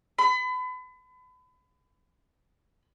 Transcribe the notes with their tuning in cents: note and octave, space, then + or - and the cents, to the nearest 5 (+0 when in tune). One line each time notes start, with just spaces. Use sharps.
B5 +35